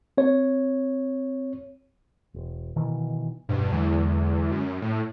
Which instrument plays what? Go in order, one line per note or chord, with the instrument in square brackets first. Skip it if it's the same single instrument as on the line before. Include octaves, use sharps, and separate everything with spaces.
[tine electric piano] C4 C#5
[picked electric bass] E1
B2 D#3 E3
[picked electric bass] E1 B2 [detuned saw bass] G2
[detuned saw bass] E2 [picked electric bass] D3 F#3 G#3
[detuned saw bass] F#2
A2